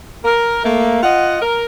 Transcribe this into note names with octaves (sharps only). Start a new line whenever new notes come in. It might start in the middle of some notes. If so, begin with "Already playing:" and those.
A#4
A3 A#3
F4 D#5 F#5
A#4